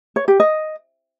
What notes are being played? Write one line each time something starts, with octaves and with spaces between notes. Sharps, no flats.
C#5
G4
D#5